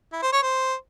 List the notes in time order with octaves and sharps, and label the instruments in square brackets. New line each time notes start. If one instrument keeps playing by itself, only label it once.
[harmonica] E4
C5
C#5
C5